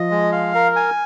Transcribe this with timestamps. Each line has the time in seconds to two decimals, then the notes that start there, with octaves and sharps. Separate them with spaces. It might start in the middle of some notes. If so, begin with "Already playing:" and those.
Already playing: F3 D#5
0.11 G#3
0.32 F5
0.55 A#4
0.76 G#5